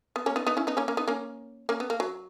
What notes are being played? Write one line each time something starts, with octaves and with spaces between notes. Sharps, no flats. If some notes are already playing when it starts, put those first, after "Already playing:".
B3
A#3 C#4
B3 D#4
B3 D#4
C#4 E4
B3 D#4
A#3 C#4
A#3 C#4
B3 D#4
A#3 C#4
A#3 C#4
B3
A#3
F#3